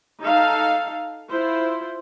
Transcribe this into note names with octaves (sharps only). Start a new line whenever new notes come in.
D#4 A4 F5
E4 F4 C5